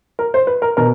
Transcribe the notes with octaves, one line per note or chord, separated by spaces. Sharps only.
A#4
C5
B4
A#4
B2 A#4